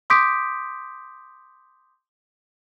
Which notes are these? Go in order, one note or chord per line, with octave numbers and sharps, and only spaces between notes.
C6 D6 D#6 G6 B6 D7